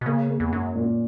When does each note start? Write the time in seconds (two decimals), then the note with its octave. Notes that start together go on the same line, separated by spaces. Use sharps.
0.01 B2
0.06 C#3 A#3
0.29 A#3
0.40 E2
0.52 F#2 C#4
0.75 A#2